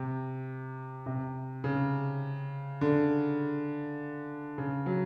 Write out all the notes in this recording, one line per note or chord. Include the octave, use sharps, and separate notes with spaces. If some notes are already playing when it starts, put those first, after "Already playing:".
Already playing: C3
C3
C#3
D3
C#3
F#3